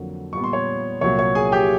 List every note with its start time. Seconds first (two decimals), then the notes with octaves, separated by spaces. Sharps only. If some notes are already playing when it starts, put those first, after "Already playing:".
Already playing: F2 D3 F#3 A#3
0.33 A#2 G3 B3 C#6
0.44 C6
0.53 C#5 C#6
1.01 C2 A#2 F#3 A#3 C#5 C#6
1.19 C#5 C#6
1.35 G#4 G#5
1.52 G4 G5